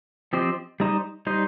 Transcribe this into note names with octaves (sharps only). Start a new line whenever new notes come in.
F3 C4 G4 C5 D#5
G3 D#4 C5 D#5
G3 D#4 C5 D#5